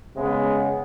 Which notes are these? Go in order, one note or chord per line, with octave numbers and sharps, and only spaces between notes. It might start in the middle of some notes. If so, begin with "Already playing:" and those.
C#3 G#3 B3